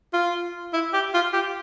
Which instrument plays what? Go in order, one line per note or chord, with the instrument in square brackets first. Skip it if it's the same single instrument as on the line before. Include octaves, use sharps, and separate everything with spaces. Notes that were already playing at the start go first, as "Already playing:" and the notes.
[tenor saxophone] F4
E4
G4
F4
G4